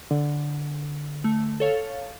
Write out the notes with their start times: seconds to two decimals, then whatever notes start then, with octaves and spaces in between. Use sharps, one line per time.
0.11 D3
1.24 A3
1.60 A4 C#5 F5